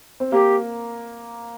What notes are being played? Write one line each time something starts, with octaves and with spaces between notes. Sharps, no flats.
C4
A#3 G4